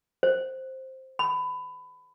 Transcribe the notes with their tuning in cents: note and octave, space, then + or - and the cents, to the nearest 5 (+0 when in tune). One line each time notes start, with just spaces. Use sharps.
C5 +5
B5 +20